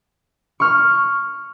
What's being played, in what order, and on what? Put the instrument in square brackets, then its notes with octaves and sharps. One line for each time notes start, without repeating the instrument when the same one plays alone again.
[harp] C#6 F6